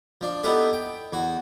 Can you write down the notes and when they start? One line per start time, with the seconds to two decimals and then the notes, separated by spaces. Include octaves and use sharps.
0.21 F3 D4
0.43 B3 D#4 E4 G4 A4 B4
0.73 G5
1.13 E2 F#4